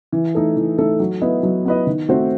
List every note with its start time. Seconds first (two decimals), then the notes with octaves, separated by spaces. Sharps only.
0.12 E3
0.35 A3 D#4 A4
0.56 E3
0.78 A3 D#4 A4
1.00 F#3
1.21 B3 E4 B4 D#5
1.43 F#3
1.65 B3 E4 B4 D#5
1.87 D#3
2.09 A3 C4 F#4 C5